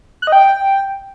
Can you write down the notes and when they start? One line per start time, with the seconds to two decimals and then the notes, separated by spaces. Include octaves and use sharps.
0.22 F#6
0.27 D#5
0.32 G5